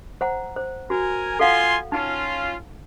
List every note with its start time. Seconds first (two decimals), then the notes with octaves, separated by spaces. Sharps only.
0.21 C5 F#5 A#5
0.56 C5
0.90 F#4 A#4 G#5
1.40 F4 A4 F5 F#5 G#5 C6
1.92 C#4 D#4 F4